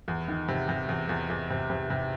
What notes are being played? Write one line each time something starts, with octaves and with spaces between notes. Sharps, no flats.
E2
D#3
C3
C3
E2
E2
E2
C3
C3
C3